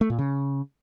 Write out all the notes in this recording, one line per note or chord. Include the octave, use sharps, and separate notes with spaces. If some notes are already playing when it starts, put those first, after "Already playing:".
A3
A#2
C#3